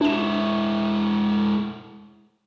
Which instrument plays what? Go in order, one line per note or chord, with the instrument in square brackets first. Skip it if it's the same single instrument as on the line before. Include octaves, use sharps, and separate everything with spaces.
[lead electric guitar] G#3 E4 [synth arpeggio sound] D4 E7